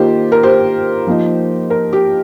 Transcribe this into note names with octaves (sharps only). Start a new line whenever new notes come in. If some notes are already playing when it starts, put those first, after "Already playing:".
Already playing: D#3 A#3 F4 G4 C5
A#4
G4 C5
F3 A#3 D#4
A#4
G4